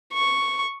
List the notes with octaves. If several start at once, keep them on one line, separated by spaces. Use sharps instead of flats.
C#6